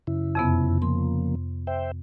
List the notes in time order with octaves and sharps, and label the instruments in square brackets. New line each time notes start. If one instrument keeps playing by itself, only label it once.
[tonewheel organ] F#2 C#3 E4
[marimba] F2 C3 B3
[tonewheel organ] C#3 F3 A#3 [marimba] C6
[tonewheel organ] C5 E5 G5